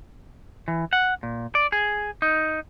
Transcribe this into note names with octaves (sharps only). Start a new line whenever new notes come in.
E3
F#5
A#2
D5
G#4
D#4